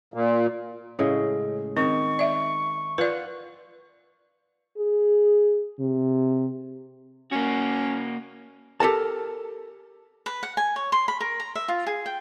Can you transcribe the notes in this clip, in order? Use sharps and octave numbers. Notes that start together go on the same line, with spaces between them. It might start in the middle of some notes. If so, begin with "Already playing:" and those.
A#2
A2 C#3 G#3
D#3 C4 C#6
D5 E5
F4 B4 D5 F#5
G#4
C3
A#3 C#4 F#4
G4 A4 A#4 A5
B4
F#5
G#5
C#5
C6
B5
A#4
A#5
E5
F4
G#4
G5